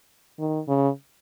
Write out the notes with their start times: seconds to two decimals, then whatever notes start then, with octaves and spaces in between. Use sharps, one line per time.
0.39 D#3
0.68 C#3